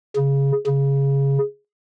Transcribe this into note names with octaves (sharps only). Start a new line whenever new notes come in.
C#3
C#3